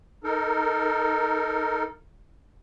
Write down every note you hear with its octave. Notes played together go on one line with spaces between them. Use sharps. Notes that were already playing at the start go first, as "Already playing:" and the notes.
D#4 A4 A#4